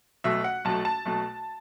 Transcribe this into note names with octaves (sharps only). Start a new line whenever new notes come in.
B1 B2 A3 E5
F#5
B1 B2 A3 A5
A5
B1 B2 A3